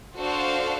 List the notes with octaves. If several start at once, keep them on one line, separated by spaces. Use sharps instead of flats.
D4 F#4 A4 C5 F5